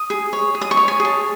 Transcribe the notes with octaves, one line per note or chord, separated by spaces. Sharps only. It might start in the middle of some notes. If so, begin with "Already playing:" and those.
Already playing: D#6
G#4
C#5
G#4
D#6
C#6
C#5
G#5
G#4
A5